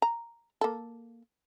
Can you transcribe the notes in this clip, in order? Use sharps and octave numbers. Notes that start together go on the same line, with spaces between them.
A#5
A#3 A4